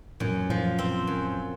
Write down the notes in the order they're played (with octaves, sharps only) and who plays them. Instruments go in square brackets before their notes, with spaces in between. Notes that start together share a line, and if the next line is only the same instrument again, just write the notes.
[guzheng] F#2 [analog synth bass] A#2
[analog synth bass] A#2 [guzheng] F3
[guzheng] C4
F#2